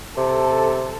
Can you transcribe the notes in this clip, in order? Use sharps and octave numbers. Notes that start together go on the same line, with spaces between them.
C3 A4